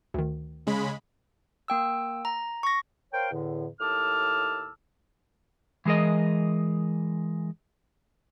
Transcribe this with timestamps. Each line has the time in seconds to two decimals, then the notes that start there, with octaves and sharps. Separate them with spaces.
0.14 D2 D#3
0.67 C#3 G#3 B5
1.68 A#3 G5 E6
2.25 A#5
2.63 C#6 A#6
3.12 A#4 C5 C#5 F5 G5
3.31 E2 A2 D3
3.80 D#2 A2 A5 D6 E6 F6
5.85 E3 G#3 G#4 A#4 D#5